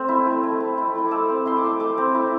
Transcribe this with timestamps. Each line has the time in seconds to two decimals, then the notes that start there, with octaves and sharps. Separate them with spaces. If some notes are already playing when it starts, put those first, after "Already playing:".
Already playing: A3 C4
0.08 E4
0.27 A3
0.43 A3
0.60 C4
0.78 E4
0.95 A3 C6
1.05 D6
1.11 A3 E6
1.29 C4
1.46 E4 C6
1.57 D6
1.64 A3
1.80 A3 D6
1.98 C4
2.15 E4